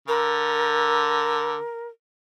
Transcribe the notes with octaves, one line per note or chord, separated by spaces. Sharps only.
D3 A#4